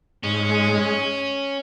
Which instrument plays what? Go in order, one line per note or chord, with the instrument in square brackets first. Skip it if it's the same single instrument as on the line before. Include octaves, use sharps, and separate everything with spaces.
[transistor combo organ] G#2 [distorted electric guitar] C#4
[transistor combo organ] G#3
G#3